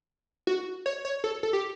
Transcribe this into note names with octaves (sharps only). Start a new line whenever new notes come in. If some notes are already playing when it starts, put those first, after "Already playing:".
F#4
C#5
C#5
A4
A4
G4